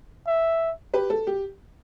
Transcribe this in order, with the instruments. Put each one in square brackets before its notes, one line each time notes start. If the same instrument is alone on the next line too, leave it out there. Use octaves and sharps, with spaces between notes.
[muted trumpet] E5
[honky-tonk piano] G4 B4
A4
G4